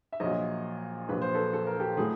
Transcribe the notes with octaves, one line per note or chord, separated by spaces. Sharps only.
E5
A#1 A#2 F#3 C#5 D#5
A#1 A#2 F#3 B4
C5
A4 B4
A4
A#4
G4 A4
A2 F#3 G#4